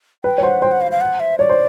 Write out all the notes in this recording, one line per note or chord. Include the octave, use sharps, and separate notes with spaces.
B4 G5
C#5
C5 F#5
C5 G5
F#5
F5
F5
F#5
E5
C#5 D5
C5